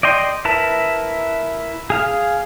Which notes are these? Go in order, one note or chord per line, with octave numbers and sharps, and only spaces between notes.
D5 D#5 G5 C6
E4 A#4 B4 E5 A5
G#4 F5 F6